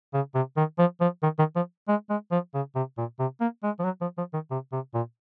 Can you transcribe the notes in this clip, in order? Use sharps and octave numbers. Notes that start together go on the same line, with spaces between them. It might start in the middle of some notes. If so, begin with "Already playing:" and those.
C#3
C3
D#3
F3
F3
D#3
D#3
F3
G#3
G#3
F3
C#3
C3
A#2
C3
A#3
G#3
F3
F#3
F3
F3
D#3
C3
C3
A#2